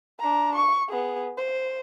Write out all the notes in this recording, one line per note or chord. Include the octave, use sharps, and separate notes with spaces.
D4 A#5
C#6
B3 G#4
C5